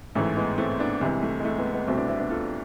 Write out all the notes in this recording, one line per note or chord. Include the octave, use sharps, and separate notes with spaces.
A1 G#2 E3 A3
G#3 B3
A3 C4
B3 D4
C2 C3 E3 G#3
A3
G#3
A3
G#3 B3
G#3 B3
C2 B2 A3 C4
B3 D4
C4 E4
B3 D4
F4 A4